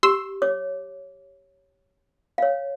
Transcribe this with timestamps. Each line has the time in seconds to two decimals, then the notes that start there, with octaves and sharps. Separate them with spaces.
0.03 G4 C6 E6
0.42 C#5 D6
2.38 C#5 F5